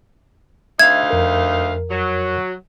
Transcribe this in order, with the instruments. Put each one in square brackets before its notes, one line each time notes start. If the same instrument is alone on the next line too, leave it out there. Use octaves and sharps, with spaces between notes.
[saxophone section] D2 D#4 F5 [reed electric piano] E5 [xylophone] G#6
[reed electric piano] F2 A#4
[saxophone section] F#3